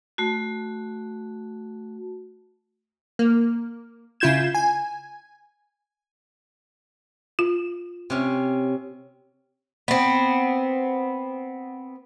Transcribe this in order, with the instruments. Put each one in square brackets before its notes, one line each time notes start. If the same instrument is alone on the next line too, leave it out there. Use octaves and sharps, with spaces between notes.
[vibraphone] A3 F#4
[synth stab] A#3
C#3 E4 F4 G6 G#6 E7
G#5
[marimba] F4
[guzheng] C3 C#4
[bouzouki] B3 C4